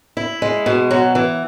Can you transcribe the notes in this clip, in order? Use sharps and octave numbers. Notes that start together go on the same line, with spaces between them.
E4
G#3
B2
F#3
E3